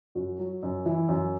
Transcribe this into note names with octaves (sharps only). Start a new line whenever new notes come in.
F#2 F#4
F#3
F#2
E3 E4
F#2